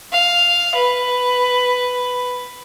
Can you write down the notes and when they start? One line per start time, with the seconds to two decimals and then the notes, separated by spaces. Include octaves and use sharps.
0.12 F5
0.75 B4